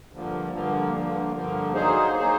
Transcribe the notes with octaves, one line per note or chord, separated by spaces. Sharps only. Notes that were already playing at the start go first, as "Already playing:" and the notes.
G2 D3 F3 A#3
G2 D3 F3 A#3
G2 D3 F3 A#3
G2 D3 F3 A#3
F#3 A#3 D#4 G#4 C5
F#3 A#3 D#4 G#4 C5